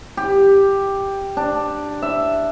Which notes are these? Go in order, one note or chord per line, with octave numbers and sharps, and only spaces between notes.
G4
D4
E5